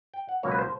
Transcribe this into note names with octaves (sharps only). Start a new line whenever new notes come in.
G5
F#5
C#2 B2 F#3 A#3 C#5
B4
C5